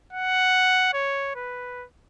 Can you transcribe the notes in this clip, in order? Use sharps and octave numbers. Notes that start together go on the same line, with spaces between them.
F#5
C#5
B4